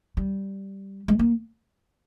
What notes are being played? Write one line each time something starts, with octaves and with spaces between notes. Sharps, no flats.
G3
G#3
A#3